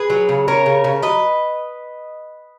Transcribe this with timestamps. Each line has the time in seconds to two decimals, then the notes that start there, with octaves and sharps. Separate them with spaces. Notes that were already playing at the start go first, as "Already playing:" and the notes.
Already playing: G#4 B4
0.10 F#3
0.29 C#3
0.48 C#4 A#4 C#5
0.66 C#3
0.84 C#3
1.03 F#3 B4 D#5